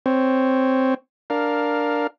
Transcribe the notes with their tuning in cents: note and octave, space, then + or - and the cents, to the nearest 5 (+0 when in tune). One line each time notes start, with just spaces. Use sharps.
C4 +0 C#5 +0
D4 +0 A#4 +0 F5 +10